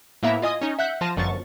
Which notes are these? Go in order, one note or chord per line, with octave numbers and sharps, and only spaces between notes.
A2 A#3 B3 E4 E5 A#5
F4 D#5 G#5 D#6
C#4 D#4
E5 F#5 F#6 G6 B6
F3 F4 A5 A#6 D#7
G1 F#2 F3 C#6 A6